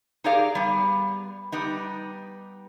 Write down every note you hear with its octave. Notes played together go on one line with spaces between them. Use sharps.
D#4 G4 G#4 A#4 D5 F5
G3 B3
G3 B3 D#4